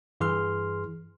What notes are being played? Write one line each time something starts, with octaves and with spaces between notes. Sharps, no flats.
G2 E3 G#4 C6 F6